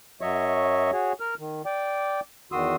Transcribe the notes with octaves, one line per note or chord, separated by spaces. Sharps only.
F#2 F#3 C#5 D#5 E5 C#6
F#4 G#4 C#5
A#4 F6
D#3
D5 G5 D6
E2 D#3 F#4 C6 D#6 E6